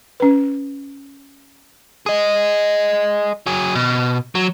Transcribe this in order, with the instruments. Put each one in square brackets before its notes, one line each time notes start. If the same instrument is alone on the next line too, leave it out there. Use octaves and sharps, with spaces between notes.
[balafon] C#4 B4
[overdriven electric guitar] G#4 D#5
F#3 G#4
B2
F#3